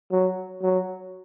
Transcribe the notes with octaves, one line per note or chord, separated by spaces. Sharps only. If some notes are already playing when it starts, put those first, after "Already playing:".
F#3
F#3